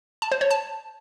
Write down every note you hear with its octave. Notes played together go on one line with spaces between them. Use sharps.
A5
C5
C#5
A5